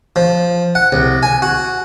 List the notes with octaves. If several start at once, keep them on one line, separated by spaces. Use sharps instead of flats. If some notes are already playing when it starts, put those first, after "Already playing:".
F3
F#5
C2
G#5
F#4